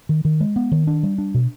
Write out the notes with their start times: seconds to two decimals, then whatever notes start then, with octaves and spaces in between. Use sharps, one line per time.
0.09 D#3
0.25 D#3
0.40 G#3
0.56 B3
0.72 D#3
0.87 D4
1.03 G3
1.18 D4
1.35 B2